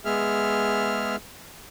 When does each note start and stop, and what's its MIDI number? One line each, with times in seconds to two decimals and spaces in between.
0.05 1.16 56
0.05 1.16 59
0.05 1.16 68
0.05 1.16 76
0.05 1.16 89